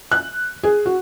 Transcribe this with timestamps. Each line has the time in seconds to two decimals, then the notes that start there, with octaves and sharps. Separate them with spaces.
0.12 F#6
0.63 G#4
0.86 F#4